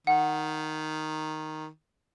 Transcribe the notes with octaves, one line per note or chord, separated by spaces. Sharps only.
D#3 F#5